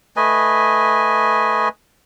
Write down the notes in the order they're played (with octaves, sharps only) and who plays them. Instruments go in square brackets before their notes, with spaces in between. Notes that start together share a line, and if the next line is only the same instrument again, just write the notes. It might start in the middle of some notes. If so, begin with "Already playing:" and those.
[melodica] A3 B4 D#5 G#5